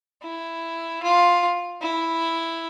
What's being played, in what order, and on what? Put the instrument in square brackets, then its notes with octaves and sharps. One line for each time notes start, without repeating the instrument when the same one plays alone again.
[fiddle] E4
F4
E4